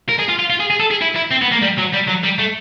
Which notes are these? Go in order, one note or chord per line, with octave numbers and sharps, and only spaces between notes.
A#4
G#4
F4
F4
F4
G#4
G#4
A4
G#4
E4
E4
C4
B3
A#3
G3
F#3
G3
F#3
G3
A3